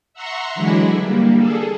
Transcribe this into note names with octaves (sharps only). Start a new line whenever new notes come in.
E5 F#5 A#5 C6 C#6
D3 E3 F#3 G#3 D4 E4
G3 A#3
G#4 A4